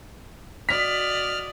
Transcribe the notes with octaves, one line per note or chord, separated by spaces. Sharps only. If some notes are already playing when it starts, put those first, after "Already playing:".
F#4 D5 D#5 F6 B6